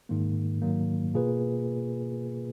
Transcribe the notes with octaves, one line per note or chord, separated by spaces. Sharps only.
G#2 D#3 A#3
G#2 D#3 F#3 A#3
B2 A#3 F4 G#4 B4